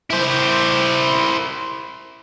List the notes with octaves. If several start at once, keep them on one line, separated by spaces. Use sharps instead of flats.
E4 C5